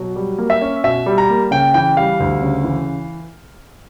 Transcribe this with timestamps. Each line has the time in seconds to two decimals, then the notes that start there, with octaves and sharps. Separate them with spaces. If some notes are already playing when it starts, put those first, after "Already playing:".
Already playing: B2 F#3
0.16 G3
0.38 A#3
0.50 E5
0.61 C#4
0.84 B2 E5
1.06 G3
1.18 A#5
1.30 A#3
1.51 C#3 G5
1.74 E3 G5
1.97 G3 F5
2.20 D2
2.42 C#3
2.64 E3